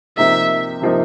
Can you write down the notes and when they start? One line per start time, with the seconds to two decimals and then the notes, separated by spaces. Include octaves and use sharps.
0.17 C3 F3 A#3 D#4 E5
0.82 C3 F3 A#3 D#4